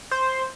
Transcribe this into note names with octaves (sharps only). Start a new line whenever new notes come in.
C5